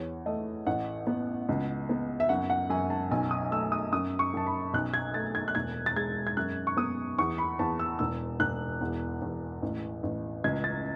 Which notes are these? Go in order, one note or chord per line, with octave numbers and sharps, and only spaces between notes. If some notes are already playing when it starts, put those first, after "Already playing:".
Already playing: E2 C#5
A3 D#5
A1 F#5
B3
C#2
B3
E5
F#2 F#5
F#5
F#2 G#5
A5
B1 G#5
D#6
A3 E6
D#6
F#2 D#6
C#6
F#2 A5
B5
B1 F#6
G#6
A3 A6
G#6
F#6
E1 G#6
A6
G#3 G#6
G#6
F#2 F#6
C#6
B3 D#6
E2 C#6
B5
E2 A5
E6
E1 E6
E1 F#6
E2
E2
A1
A1
C#2 G#6
A6